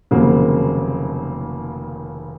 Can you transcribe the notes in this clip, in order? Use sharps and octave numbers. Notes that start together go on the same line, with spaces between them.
F1 D#2 C#3 F#3 A#3